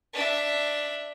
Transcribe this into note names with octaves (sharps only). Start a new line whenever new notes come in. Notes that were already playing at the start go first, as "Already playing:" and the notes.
D4 E5